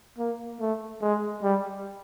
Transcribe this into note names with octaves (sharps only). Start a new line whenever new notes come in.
A#3
A3
G#3
G3